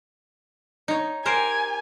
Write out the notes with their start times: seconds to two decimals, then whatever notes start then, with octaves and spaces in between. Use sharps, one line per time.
0.88 D#4 C#5
1.25 G4 A#4 C5 G#5